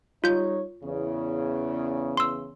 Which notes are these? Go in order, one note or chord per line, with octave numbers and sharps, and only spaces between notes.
G3 D#4 F4 C#5 G6
E2 C#3
C6 E6